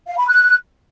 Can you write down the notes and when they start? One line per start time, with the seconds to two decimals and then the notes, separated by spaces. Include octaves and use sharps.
0.07 F5
0.18 B5
0.28 F#6